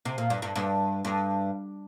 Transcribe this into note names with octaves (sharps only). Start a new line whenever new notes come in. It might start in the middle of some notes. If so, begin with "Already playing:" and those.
C3
A#2
G2
G2
G2
G2